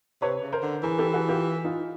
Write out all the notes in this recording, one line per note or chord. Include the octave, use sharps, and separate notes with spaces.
C3 B4 C#5
C#3
A#4 C5
D3
E3 G#4 A#4
G4 A4
F#4 G#4
F4 G4
D#4 F4